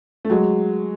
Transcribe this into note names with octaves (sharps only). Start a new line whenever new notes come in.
A3
F#3 G#3